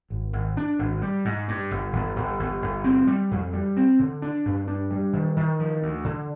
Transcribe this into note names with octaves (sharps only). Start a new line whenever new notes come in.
G#1
G#1
D4
G#1
G3
G#2
G2
G1
G1
G1
G1
G1
C4
G3
F2
G3
C4
D3
D4
G2
D4
G3
D#3
D#3
F3
D2
D3